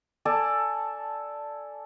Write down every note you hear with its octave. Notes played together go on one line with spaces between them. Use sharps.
A4 D5 G#5 A5